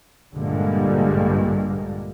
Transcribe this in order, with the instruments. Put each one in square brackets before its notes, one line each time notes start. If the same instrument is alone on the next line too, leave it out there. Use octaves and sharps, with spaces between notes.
[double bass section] A#1 G2 D3 G3 G#3 A#3